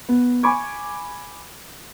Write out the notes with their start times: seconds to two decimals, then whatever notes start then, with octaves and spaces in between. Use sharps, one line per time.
0.09 B3
0.43 G#5 B5 C#6 D6 G#6